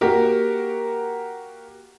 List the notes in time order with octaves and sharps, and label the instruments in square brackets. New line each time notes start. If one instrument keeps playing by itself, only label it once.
[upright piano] A#3 F#4 G4 A#4